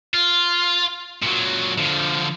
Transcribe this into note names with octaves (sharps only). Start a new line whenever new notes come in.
F4
A#2 F#3
D3 F3